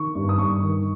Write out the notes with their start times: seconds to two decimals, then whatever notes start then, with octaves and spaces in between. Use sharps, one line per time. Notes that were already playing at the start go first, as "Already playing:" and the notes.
Already playing: D#3 C#6
0.15 G2
0.29 D#6
0.38 G2 C#6
0.62 D#3